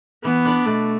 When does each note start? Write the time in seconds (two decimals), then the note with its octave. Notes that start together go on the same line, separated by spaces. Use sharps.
0.24 E3 B3
0.45 D4 B4 D5
0.66 B2 A3